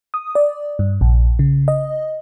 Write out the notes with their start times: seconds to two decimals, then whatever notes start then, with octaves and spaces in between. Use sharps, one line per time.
0.14 D#6
0.35 D5
0.79 G2
1.01 A#1
1.39 C#3
1.68 D#5